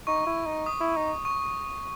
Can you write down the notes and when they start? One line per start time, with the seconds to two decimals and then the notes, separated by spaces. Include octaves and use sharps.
0.07 D#4 C#6
0.27 E4
0.46 D#4
0.66 D#6
0.80 E4
0.96 D#4
1.25 C#6